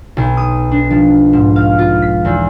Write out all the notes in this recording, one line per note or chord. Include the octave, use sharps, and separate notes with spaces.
B1
D#6
D4
F3
G#2
F5
F4
B6
E2